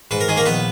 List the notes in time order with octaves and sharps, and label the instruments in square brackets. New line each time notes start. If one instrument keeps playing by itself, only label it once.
[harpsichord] G#2 B4
A#4
D#3 G#4
A#3 A#4
A#1 B3 B4